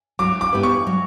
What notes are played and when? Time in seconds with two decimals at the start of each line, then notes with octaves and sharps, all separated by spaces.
0.19 F#3 D6
0.41 D6
0.53 B3 E4 G4 B4
0.63 C#6
0.87 F#3